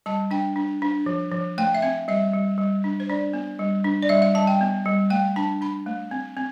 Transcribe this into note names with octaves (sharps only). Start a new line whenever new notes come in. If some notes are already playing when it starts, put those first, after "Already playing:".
G3 A5
D4 G5
D4
D4
F3
F3
A3 G5
E5
C4 F5
G3 E5
G3
G3
D4
C5
D4 D5
B3
G3
D4
D5
G3 E5
F5
G3 A5
G5
B3
G3
A3 G5
D4 A5
D4 B5
A3
C4
C4